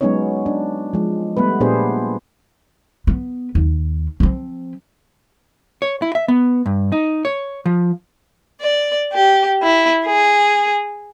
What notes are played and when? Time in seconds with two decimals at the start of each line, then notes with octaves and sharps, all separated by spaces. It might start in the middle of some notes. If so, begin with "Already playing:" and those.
0.01 F#3 G#3 B3 C#4 D#4 C#5
0.46 D4
0.93 F3 G#3
1.37 G3 A3 B3 B4
1.60 A#2 B3 D4 G4 G#4 C5
3.07 B3
3.55 D#2
4.20 F3 C4
5.82 C#5
6.02 E4
6.15 E5
6.28 B3
6.66 G2
6.92 D#4
7.25 C#5
7.66 F3
8.61 D5
9.12 G4
9.63 E4
10.04 G#4